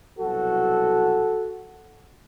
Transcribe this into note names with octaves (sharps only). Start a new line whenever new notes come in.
C2 B2 F#3 F#4 A4